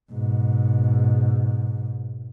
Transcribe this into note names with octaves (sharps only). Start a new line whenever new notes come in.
G#2 B2